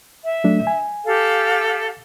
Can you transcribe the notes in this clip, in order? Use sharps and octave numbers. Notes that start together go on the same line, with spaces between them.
E5
F#3 A3 D4
G#5
G4 A4 F5